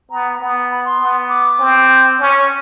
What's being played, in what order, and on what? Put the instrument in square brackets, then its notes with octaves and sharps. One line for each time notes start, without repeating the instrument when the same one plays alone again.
[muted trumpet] B3 [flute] A#5
[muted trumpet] B3
[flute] B5
C6
[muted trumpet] B3
[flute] D6
[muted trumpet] C4
C#4